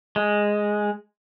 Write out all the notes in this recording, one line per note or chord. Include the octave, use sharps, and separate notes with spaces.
G#3